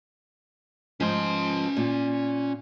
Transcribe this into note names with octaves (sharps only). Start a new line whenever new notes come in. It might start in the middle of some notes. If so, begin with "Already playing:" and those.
G#2 F3 C#4 C6
A#2